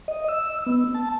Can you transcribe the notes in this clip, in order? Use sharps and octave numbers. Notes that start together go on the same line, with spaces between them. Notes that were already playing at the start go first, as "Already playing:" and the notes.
D#5
E6
B3
A5